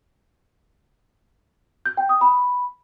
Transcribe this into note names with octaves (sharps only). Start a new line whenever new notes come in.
G6
G5
D#6
B5